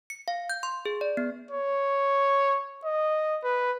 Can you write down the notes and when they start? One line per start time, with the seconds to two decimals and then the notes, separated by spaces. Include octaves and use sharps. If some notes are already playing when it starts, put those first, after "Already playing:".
0.10 C#7
0.28 F5
0.50 G6
0.63 C6
0.86 G#4
1.01 D5
1.17 B3
1.51 C#5
2.85 D#5
3.44 B4